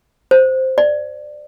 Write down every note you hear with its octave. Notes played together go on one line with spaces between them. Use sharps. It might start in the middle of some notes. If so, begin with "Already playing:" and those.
C5
D5